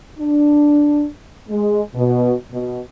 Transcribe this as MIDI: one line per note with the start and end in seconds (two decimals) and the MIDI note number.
0.18 1.04 62
1.49 1.79 56
1.95 2.32 47
2.52 2.79 47